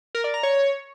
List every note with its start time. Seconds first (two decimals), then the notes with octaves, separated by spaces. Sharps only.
0.15 A#4
0.24 D5
0.34 A#5
0.43 C#5